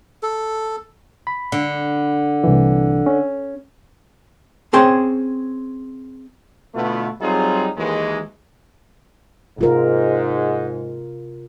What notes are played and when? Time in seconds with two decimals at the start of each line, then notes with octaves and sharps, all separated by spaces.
0.23 A4
1.27 B5
1.52 D3
2.44 C2 E3
3.06 C#4
4.73 C4 C#4 G#4 C5 G5
6.75 B2 D3 A3 B3 E4 F4
7.21 F#3 G3 C4 D#4 F4 G#4
7.77 D#2 E3 G#3
9.59 G#2 C3 F4 A#4